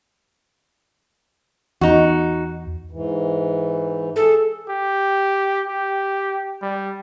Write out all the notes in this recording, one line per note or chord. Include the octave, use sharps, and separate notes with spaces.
E2 D#4 F#4
G#2 E3
G#4 A4
G4
G4
G3